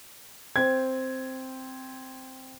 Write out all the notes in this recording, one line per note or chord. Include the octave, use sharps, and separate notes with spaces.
C4 G#6